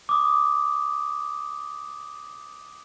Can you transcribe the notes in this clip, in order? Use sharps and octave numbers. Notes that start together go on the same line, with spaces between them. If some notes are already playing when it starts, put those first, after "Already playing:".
D6 D#6